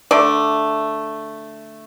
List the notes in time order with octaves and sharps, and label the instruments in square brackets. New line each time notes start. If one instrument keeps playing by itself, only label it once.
[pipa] D3 A3 D5